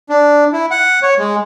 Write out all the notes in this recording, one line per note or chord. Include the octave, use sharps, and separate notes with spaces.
D4
E4
F#5
C#5
G#3